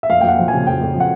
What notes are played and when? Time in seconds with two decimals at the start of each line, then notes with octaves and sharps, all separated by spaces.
0.03 E5
0.10 F2 F5
0.21 F2 G5
0.28 F#5
0.39 F3
0.48 C#3 G#5
0.67 F2 G5
0.81 F2
0.95 F3 F#5